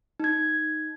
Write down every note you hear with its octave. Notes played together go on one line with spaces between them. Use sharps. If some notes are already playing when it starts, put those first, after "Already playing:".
D#4 G#6